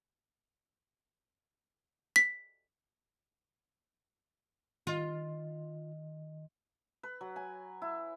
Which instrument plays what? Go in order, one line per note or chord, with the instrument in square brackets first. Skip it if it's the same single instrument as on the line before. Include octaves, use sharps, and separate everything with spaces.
[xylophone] B6
[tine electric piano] D#3 D#5 [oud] F4
[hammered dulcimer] B4
F#3
G#5
E4